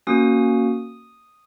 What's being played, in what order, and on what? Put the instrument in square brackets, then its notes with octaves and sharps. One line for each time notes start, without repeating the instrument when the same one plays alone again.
[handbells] A#3 C#4 F#4 D#6